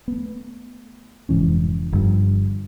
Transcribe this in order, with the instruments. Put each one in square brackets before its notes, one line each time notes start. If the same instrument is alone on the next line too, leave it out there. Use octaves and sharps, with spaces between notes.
[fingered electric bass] A3 B3
F1 G#2 E3 C#4
G1 G2 F3